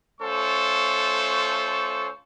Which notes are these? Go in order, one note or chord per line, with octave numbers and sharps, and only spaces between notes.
A3 C#4 F4 A4 C5 C#6